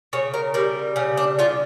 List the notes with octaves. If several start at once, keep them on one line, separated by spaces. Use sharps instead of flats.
C#3 C#5
A#4
G3 A#4
C#3 C#4
D4
C#3 F4